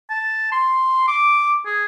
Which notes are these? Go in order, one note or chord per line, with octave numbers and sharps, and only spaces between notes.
A5
C6
D6
G#4